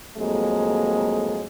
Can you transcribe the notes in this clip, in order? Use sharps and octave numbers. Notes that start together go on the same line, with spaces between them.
F2 A2 F#3 G#3 A#3